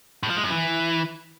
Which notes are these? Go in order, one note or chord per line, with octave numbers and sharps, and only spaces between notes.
A2
F3
G#3
F#2
E3